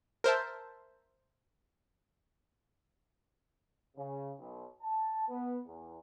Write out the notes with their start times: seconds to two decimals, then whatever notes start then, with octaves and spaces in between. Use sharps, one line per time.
0.24 A#4 C5 E5 A5
3.97 C#3
4.39 B1
4.82 A5
5.29 B3
5.66 E2